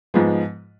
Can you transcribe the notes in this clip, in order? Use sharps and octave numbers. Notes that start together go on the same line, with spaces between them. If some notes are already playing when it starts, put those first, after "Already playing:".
G#2 F3 G#3 B3